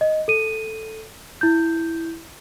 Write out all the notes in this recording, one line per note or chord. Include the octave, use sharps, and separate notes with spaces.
D#5
A4 D#7
E4 G6